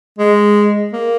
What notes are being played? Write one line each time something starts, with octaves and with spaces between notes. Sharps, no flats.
G#3
A#3